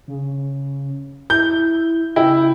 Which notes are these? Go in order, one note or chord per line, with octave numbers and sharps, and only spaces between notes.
C#3
E4 G6
C#3 E4 G5